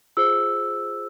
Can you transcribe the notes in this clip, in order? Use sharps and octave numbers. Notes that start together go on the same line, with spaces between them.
F4 G#4 C5 E6